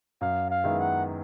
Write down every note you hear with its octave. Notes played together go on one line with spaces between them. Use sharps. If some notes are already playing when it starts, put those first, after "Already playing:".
F#2 F5
F5
D#3 G#3 B3 E4
F#5